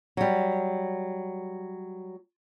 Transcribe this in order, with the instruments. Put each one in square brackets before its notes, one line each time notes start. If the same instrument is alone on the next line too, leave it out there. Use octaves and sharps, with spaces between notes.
[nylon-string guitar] F#3 G3